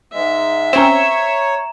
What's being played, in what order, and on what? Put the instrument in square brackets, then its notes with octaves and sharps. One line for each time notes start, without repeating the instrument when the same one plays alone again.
[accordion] G#2 G#3 [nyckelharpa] E5
[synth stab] C4 C#4 [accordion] C#5 [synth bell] A#5 E7